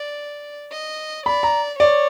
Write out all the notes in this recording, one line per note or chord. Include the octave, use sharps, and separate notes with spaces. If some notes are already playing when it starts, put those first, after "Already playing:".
Already playing: D5
D#5
D5 B5
A#5
C#5 D5